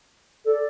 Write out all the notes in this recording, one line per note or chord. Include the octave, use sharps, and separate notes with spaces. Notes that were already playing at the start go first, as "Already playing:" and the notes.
A4 D5